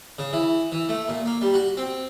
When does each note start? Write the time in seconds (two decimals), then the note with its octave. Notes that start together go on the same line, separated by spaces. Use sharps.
0.19 C#3
0.33 E3
0.72 E3
0.89 A3
1.08 A#2
1.26 A#3
1.41 G3
1.54 F#4
1.77 C4